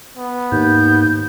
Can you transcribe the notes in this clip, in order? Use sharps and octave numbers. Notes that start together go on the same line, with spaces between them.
B3
D#2 G#2 G6